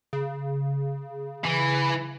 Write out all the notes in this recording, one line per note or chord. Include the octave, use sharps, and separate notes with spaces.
C#3
E3